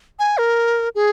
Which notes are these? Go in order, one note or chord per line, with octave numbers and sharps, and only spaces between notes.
G#5
A#4
G#4